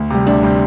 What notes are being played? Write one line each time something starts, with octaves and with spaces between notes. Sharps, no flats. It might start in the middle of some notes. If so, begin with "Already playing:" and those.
Already playing: D2
C3 G3
D2 D4
C3 G3